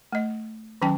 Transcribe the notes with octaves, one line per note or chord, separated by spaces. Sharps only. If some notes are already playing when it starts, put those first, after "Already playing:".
A3 D#5
D#3 F#3 C#4 G5 A5